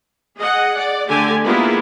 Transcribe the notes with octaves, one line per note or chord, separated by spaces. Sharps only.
G#4 D#5 F#5
D5
D3 A3 G4 G#5
G#3 A#3 B3 E4 F4 G4